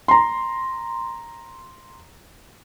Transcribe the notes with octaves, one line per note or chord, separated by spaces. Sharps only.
A#5 C6